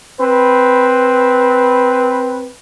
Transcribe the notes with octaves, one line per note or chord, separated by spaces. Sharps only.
C4 B4